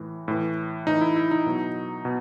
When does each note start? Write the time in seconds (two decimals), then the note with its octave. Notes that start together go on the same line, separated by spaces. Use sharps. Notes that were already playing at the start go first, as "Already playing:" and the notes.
Already playing: A2 E3
0.28 A2 E3
0.87 A2 E3 D#4
1.01 E4
1.16 E4
1.31 D#4
1.46 B2 F#3
2.05 B2